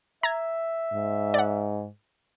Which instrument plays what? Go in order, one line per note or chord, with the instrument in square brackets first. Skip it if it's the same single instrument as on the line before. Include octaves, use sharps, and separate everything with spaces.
[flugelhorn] E5 [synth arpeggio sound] A#5 G#6
[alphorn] G#2
[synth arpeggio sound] D5 F#5